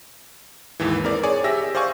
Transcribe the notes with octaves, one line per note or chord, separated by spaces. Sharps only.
D#2 G#2 E3
C4 A#4 D5
G#4 C#5 D5 G#5
G4 E5 E6 A#6
C5 D5 F5 G#5 C#6